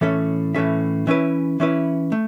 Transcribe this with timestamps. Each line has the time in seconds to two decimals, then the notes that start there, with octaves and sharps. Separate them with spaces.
0.01 A2 E3 C#4 A4 E5
0.55 A2 E3 C#4 A4 E5
1.07 E3 C#4 E4 B4
1.60 E3 C#4 E4 B4
2.12 A3